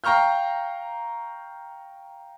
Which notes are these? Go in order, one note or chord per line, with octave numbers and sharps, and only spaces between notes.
F5 G5 A#5 C#6 F6 G6